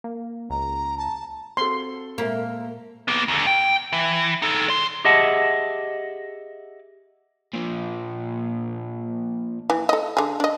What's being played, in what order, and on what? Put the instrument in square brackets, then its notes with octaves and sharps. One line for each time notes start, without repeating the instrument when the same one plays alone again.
[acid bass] A#3
[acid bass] C#2 [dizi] A#5
[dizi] A5
[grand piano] C4 F#4 A4 [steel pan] C6
[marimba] A#2 G#3 E5 [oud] A#3
[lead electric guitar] A#3 B3
D#2 D3
G5
E3
D#4 A4
D5 C6
[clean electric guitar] G4 G#4 D#5 E5 F#5 A5
[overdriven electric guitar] A#2 F3
[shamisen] E3
A4 D#5
D3 G#4
D4 D#5